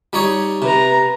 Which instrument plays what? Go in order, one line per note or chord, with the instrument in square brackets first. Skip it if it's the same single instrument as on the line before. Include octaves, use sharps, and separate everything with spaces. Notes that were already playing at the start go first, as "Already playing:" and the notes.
[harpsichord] G3 D#4 C#5
[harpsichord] C3 [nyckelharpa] B4 A#5